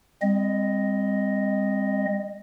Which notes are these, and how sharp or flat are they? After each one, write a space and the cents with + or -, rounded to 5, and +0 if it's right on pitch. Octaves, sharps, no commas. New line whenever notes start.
G3 +40 C4 +0 D#5 +0